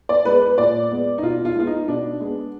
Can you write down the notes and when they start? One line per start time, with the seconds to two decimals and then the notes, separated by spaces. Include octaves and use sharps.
0.09 D5
0.25 G#3 B3 B4
0.42 B4
0.58 A#2 D5
0.91 G#3 B3
1.18 D#4
1.23 B2 F4
1.45 F4
1.55 G#3 B3 F4
1.67 D#4
1.88 B2 D4
2.20 G#3 B3